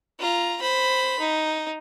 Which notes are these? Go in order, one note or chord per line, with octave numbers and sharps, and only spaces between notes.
F4 A#5
C5 B5
D#4